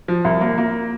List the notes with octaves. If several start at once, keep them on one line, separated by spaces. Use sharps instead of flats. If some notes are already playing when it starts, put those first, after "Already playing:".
F3
C2
A#3
A#3